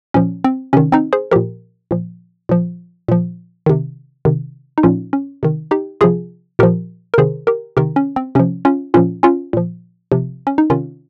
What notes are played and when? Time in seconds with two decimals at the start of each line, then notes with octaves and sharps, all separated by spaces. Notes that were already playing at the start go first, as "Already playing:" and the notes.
0.14 A#2 F3 C#4
0.44 C4
0.73 C3 D#3 C#4
0.92 C4 D#4
1.13 G#4 C5
1.31 A#2 F3 G4 A#4
1.91 A#2 F3
2.49 A#2 F3
3.08 A#2 F3
3.66 C3 D#3
4.25 C3 D#3
4.78 D#4
4.83 A#2 F3 C#4 F4
5.13 C#4
5.43 C3 D#3
5.71 D#4 G4
6.01 C3 F3 F4 G#4
6.59 A#2 F3 G4 A#4
7.14 A#4
7.18 C3 D#3 G#4 C5
7.47 G4 A#4
7.77 C3 D#3 G4 A#4
7.96 C#4
8.16 C4
8.35 C3 F3 C#4
8.65 C#4 F4
8.94 A#2 F3 C#4 F4
9.23 C#4 F4
9.53 A#2 F3
10.12 C3 F3
10.47 C#4
10.58 D#4
10.70 C3 D#3 C#4 F4